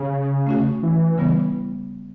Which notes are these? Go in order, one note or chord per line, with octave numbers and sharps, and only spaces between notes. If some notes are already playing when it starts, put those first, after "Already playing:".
Already playing: C#3
A3 C#4 F#4
E3
C#3 G3 B3